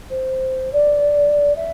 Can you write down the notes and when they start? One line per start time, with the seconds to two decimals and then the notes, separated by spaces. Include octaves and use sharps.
0.10 C5
0.72 D5
1.55 E5